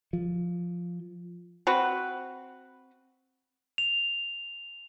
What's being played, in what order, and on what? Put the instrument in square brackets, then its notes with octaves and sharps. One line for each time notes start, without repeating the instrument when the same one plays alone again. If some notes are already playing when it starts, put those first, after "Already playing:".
[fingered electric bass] F3
[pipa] C4 F#4 B4
[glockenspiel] F7